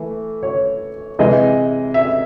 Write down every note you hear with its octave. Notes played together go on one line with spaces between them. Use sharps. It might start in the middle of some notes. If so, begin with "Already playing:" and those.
Already playing: E3 A3
C#5
C3 E3 G#3 D#5
E5